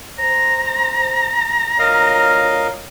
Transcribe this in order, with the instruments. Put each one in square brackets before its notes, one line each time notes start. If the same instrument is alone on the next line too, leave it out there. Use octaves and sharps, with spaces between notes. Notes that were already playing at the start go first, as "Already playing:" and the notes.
[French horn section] C5 [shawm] A#5
[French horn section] D2 F4 C#5 [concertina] A#4 D#5 F5